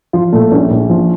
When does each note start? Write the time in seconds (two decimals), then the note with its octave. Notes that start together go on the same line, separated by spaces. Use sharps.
0.13 F3 F4
0.33 A#2 A3
0.51 A#1 C#4
0.71 A#1
0.90 F3